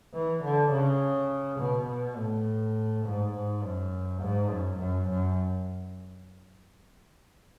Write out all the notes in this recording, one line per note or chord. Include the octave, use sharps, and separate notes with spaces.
E3
D3
C#3
B2
B2
A2
G#2
G#2
F#2
G#2
F#2
F#2
F#2